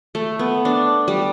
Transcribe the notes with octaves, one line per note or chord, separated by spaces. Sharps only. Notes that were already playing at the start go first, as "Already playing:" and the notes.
A3
B3
D4
G3